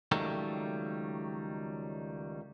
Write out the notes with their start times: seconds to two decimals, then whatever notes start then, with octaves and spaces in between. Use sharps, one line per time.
0.12 C#2 D#3 F#3 G3 A3